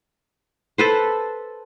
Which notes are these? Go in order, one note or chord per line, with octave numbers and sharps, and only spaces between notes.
A4 B4 C5